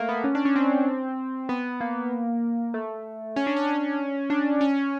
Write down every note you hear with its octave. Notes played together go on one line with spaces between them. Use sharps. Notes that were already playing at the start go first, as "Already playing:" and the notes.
Already playing: A3 A#3
B3
C#4
D4
C#4
C4
B3
A#3
A3
C#4
D4
C#4
D4
C#4